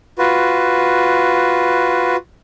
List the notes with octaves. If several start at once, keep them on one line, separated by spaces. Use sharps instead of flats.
F4 F#4 B4